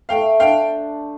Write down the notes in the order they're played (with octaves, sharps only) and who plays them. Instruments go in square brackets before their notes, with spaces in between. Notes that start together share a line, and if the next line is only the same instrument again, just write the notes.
[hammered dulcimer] A3 [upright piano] F5 G5
[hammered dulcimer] D4 [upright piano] F5 G5